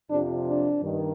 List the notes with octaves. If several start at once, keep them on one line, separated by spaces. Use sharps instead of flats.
F2 C3 F3 D4
D4
G2 D#3